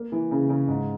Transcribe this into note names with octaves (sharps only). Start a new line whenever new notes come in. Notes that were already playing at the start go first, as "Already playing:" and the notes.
Already playing: A#3
E3
C#3
C#3
G#2